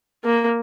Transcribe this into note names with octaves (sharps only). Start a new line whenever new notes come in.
A#3